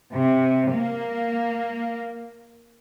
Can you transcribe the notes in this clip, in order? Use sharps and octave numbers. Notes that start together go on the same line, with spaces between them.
C3
A#3